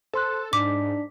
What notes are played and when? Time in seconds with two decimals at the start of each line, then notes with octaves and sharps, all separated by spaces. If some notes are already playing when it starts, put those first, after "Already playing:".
0.13 A4 C5 C6 F#6
0.53 G#2 D4 D6 B6